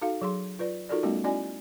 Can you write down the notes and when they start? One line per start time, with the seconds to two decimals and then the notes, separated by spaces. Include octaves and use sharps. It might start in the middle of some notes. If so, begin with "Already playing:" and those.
0.02 D#4 F#4 A4 F5
0.21 F#3 G#4 C6
0.59 F4 B4 D5
0.89 D#4 F4 F#4 A4 A#4 D5
1.03 G3 A3 B3 C#4 D#4 F#4
1.24 C#4 E4 F#4 D5 D#5 G#5